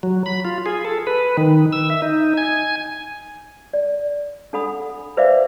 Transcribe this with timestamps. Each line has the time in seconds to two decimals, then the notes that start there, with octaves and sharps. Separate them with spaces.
0.03 F#3
0.26 B5
0.45 F4
0.66 G#4
0.85 A4
1.07 B4
1.37 D#3
1.73 E6
1.90 E5
2.02 D#4
2.38 G#5
3.73 D5
4.53 D4 A4 F#5 B5 D#6
5.17 B4 C5 D5 E5 F5 D6